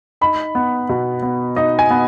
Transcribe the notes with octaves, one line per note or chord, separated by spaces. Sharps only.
D#4 B5
B3
B2
B3
D#4 D#5
G#5
B3